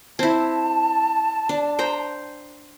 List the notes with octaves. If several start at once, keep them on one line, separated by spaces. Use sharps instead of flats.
C4 E4 A5
D4
C5 G5 A#5